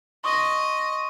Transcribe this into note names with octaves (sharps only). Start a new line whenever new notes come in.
D#5 C6 C#6 D#6